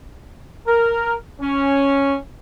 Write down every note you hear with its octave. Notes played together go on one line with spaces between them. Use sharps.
A#4
C#4